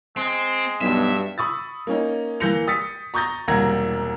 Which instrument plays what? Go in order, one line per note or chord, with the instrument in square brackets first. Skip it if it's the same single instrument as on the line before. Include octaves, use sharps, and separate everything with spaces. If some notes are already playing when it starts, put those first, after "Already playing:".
[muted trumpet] G#3 [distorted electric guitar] C4
[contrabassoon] B1 [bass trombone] G2 [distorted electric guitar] E5
[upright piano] B5 C#6 D#6 E6 A6
A#3 C#4 D#4
E3 A#3 G6 A#6 C#7 F7
D#6 A6 B6 C#7
A#5 C#6 D#6 G6 A6 A#6
E1 C2 A#3 A#5 G#6 A#6